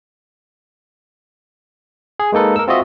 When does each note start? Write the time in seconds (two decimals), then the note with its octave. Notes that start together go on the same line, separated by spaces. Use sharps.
2.20 G#4
2.32 G#3 A#3 D#4 A4 B4
2.56 A#4 E6
2.68 C4 F4 F#4 D#5 E5